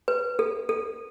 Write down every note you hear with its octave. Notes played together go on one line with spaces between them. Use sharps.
B4
A4
A4